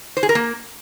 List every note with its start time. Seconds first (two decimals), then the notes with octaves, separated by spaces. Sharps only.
0.17 C5
0.23 G#4
0.29 A#4
0.35 A#3